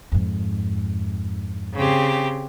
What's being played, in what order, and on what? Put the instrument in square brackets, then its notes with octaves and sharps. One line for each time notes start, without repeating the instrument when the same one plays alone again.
[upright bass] F2 G#2
[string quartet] C#3 C4 G4